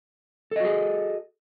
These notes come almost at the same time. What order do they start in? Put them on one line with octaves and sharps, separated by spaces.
A4 D#5 F#4 G#4